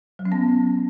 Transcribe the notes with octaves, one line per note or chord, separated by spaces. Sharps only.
F#3
C#4
B3